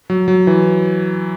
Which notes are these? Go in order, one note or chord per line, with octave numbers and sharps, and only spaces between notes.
F#3
F#3
E3